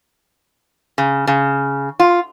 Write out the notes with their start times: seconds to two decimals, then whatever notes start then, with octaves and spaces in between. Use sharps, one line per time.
0.98 C#3
1.27 C#3
2.00 F4